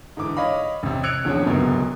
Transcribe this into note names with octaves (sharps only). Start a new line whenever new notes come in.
G#2 D3 E3 D6
C#5 D#5 F5 B5
A1 C3
E6 F#6 G#6 C#7 D7 F7
D#1 E2 G2 F3 C#4 G#4
D1 C#2 F#2 B2 B3